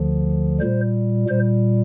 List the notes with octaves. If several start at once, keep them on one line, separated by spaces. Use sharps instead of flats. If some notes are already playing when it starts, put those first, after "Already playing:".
Already playing: D2 D3 F3
A#2 G3 C5
A#2 G3 C5